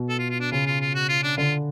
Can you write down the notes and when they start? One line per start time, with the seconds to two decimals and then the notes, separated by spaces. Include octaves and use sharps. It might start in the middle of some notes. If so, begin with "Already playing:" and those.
Already playing: B2
0.09 A4
0.19 F4
0.30 F4
0.40 D4
0.52 C#3 F4
0.66 F4
0.81 F4
0.95 F#4
1.09 F4
1.23 D4
1.38 D3 F4